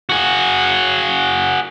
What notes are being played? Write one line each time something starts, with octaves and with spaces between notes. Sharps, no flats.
F#4 G#4